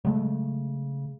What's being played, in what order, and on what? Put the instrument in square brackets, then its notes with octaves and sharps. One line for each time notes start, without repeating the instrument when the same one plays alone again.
[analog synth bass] C#3 [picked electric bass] F#3 G#3 A3